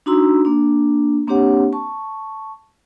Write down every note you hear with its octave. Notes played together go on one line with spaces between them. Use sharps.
D4 D#4 F#4 A#5 C6 E6
A#3 D4
A#3 C4 D4 G4 C#5 F#5
A5 C#6